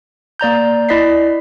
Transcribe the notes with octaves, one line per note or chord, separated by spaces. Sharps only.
A#3 D5 A#5 G6
E4 D5 D#5 B6 C7